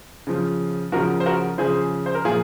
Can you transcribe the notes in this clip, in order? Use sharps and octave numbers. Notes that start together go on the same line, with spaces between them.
C#3 F3
C#3 F3 F#4 A#4
C5
F#4 A#4
C#3 F3 G#4 C5
C5
A#4
A#2 F3 F4 G#4